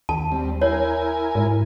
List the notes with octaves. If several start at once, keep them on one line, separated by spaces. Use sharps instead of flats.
D#2 A5
G3 C4
E4 A#4 C#5 G#5
G#2